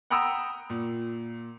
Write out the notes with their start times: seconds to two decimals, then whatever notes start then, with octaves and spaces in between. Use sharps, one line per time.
0.10 F#5 G5 A#5 B5 D#6 E6
0.70 A#2